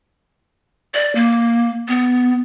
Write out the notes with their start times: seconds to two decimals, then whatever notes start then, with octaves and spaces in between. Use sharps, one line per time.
0.94 D5
1.15 A#3
1.88 B3